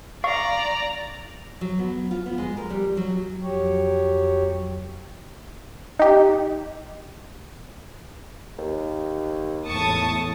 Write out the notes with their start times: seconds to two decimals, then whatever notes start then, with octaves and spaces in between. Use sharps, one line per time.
0.24 D5 F5 A#5 C#6
1.61 F#3
1.79 B3
2.11 F4
2.26 B3
2.38 G#3
2.57 A#4
2.70 G3
2.97 F#3
3.42 F2 F#3 G4 C#5
5.99 D#4 G4
8.58 D#2
9.66 E2 A2 A5 C#6 D#6